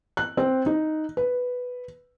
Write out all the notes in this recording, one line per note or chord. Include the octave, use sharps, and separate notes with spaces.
F#6
C4
D#4
B4